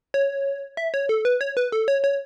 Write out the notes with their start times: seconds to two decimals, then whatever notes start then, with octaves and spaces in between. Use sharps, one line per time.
0.14 C#5
0.77 E5
0.94 C#5
1.09 A4
1.25 B4
1.41 C#5
1.57 B4
1.72 A4
1.88 C#5
2.04 C#5